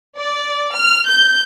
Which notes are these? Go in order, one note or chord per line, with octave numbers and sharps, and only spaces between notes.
D5
F6
G6